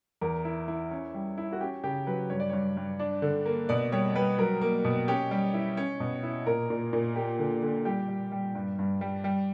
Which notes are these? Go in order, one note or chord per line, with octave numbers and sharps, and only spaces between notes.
E2 A#4
E4
E4
C#4
G3
E4
F#4
C#4 G4
C#3 G4
F#3 B4
G2 C#5
D5
G2 C#5
G2
D4
D3
A#3
B2 D5
G3 C#5
G3 B4
F#3 A#4
A#3
B2
C#4 G4
G3
E4
C#4
B2
E4
A#2 A#4
A#2
A#2
A#3 G4
D3
D3
G3 G4
G3
G3
G2
G2
G3
G3